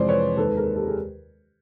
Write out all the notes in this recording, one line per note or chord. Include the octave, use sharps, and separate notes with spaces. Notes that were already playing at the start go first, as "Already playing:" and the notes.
Already playing: F2 C3 E3 G#3 C5 D5
B4 C#5
D#2 D#3 G#3 A4 B4
G#4 A#4
G4 A4
G#4